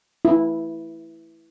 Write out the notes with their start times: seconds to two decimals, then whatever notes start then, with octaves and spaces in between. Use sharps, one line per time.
0.25 E4